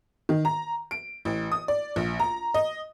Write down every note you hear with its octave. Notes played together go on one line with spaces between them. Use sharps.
D#3
A#5
D7
A1
D#6
D5
A#1
A#5
D#5